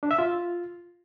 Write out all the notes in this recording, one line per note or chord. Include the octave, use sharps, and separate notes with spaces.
D4
E5
F4